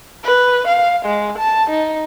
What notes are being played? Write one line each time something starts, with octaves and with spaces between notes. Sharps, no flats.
B4
F5
G#3
A5
D#4